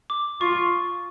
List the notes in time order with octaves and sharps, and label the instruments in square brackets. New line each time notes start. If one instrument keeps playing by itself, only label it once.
[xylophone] D6
[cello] F4 [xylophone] C#6